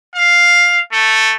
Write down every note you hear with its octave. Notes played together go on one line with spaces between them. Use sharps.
F5
A3